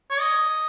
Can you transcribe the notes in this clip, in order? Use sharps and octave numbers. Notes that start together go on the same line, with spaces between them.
C#5
D#5